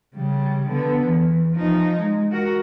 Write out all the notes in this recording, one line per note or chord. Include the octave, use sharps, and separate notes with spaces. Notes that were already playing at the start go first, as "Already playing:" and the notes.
C#3 G3
D3 B3
E2
F3 D#4
G#3
F#4 A#4